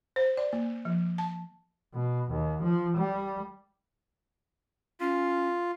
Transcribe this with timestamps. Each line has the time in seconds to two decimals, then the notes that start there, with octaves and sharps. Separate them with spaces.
0.16 C5
0.37 D5
0.53 A#3
0.85 F3
1.18 A5
1.94 B2
2.31 D#2
2.63 F3
2.97 G3
5.00 C#4 F4